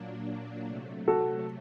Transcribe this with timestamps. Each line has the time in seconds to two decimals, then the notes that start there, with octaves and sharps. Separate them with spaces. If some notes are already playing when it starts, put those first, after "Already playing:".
Already playing: A#2 F#3 A#3 D4
0.66 C3 F#3 A3
1.08 F#4 A4